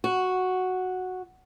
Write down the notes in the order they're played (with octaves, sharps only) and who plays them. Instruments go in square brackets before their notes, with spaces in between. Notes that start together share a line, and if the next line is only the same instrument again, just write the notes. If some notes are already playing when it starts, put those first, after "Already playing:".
[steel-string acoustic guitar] F#4